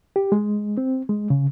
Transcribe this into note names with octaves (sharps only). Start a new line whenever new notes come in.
G4
G#3
C4
G#3
C#3